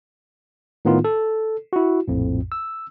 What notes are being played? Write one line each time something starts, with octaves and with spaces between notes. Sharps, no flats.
A2 D#3 B3 D#4 F4
A4
E4 F#4
A#1 F2 A2
E6